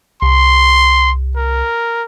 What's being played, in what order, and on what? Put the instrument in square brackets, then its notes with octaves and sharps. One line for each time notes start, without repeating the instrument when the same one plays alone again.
[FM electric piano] C2 [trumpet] C6
[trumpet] A#4